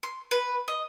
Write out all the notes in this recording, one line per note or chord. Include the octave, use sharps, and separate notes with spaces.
C6
B4
D#5